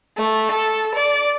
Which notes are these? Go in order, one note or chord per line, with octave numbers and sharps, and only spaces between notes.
A3
A4
D5